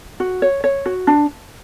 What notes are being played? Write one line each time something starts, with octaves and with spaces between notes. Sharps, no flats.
F#4
C#5
C#5
F#4
D4